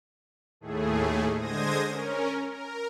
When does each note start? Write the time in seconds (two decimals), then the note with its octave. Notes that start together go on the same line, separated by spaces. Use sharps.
0.60 D#2 A2 A3 G#4
1.36 D3 G#3 C5 D#6 G#6 A#6
1.87 C#4 A#4
2.51 A#4